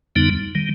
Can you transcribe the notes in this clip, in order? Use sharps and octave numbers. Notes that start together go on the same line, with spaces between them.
F2 D3 G3 B3 D#4
D#3 G3